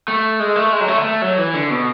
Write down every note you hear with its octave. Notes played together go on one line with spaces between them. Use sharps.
A3
G#3
A3
G#3
F#3
A3
D3
A3
F#3
E3
D3
B2